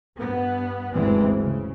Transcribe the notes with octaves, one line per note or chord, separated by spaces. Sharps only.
G2 B3
F#1 D2 G2 E3 G#3 C4
C#3